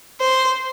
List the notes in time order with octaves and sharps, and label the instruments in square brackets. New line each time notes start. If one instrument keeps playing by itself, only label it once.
[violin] C5